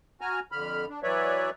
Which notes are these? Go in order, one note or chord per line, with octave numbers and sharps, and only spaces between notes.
F#4 G#5 A#5 F6
F2 D3 B5 F6
D4
E3 F#3 B4 C#5 D5 E5